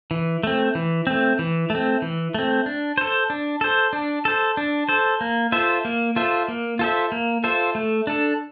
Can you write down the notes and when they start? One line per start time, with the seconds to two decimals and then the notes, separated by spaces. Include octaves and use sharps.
0.11 E3
0.43 A3 C4
0.75 E3
1.07 A3 C4
1.39 E3
1.70 A3
1.75 C4
2.02 E3
2.34 A3 C4
2.66 D4
2.98 A4 C5
3.30 D4
3.61 A4 C5
3.93 D4
4.25 A4 C5
4.57 D4
4.89 A4 C5
5.21 A#3
5.52 F4 A4 C5 E5
5.85 A#3
6.16 F4 A4 C5 E5
6.48 A#3
6.79 F4 A4 C5 E5
7.12 A#3
7.44 F4 A4 C5 E5
7.75 A3
8.07 D4 A4